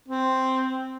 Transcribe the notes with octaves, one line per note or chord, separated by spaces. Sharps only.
C4